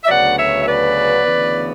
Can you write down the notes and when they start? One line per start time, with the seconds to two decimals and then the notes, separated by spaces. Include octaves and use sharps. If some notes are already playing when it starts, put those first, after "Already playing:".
0.03 E5
0.07 D2 C#3 F#3 B3 D5 F#5
0.37 C#5 E5
0.60 E5
0.66 B4 D5
1.25 D2 C#3 E3 B3